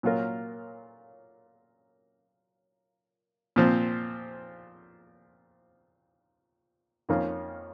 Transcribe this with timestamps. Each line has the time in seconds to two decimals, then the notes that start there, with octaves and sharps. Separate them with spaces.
0.03 A#2 F#3 C#4 F4 A#4
3.56 A#2 F3 C4
7.09 F2 D#3 A#3 C#4 F4